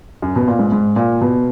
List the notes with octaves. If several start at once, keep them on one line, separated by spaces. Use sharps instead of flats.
F#2
B2
A#2
G#2
G#2
A#2
B2